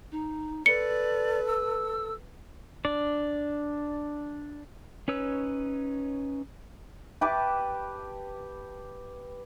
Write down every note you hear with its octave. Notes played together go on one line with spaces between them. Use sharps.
D#4
A4 B4 D5 C#7
E6
D4 D5
C#4 D#4 B4 C#5 E6
G4 B4 A5 D6